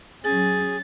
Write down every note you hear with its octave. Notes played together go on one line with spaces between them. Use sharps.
F#3 C#4 G#4 A6